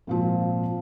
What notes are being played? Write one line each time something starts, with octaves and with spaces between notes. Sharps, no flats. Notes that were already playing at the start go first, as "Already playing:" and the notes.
G#1 A#2 F3